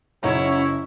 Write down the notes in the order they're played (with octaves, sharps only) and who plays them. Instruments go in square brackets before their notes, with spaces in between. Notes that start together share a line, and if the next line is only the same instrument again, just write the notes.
[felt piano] F#1 D#4 A#5 [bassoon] F#3 [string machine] C#4 E5 [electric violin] E4 C#5